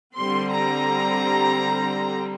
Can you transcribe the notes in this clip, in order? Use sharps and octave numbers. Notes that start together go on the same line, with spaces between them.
D3 G3 C4 C6
A#5